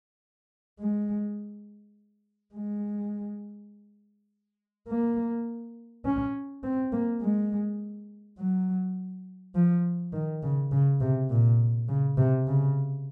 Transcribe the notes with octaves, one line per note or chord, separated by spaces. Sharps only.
G#3
G#3
A#3
C#4
C4
A#3
G#3
F#3
F3
D#3
C#3
C#3
C3
A#2
C#3
C3
C#3